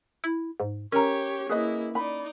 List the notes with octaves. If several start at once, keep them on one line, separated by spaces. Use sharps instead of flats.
E4
G#2
C#4 G4 A#4 C#5 A#5
A#3 E4 G#4 B4 D#5
D#4 D5 B5